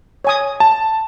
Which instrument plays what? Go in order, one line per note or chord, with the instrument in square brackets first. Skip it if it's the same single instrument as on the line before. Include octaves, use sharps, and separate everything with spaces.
[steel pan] C#5 G#5 D#6
[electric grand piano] A5